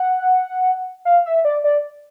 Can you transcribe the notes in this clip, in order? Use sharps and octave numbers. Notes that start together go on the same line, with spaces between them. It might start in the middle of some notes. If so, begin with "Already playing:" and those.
Already playing: F#5
F5
E5
D5
D5